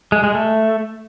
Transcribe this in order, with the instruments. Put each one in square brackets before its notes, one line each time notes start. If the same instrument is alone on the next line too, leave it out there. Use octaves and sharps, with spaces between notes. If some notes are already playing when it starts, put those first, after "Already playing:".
[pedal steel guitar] G#3
G#3
A3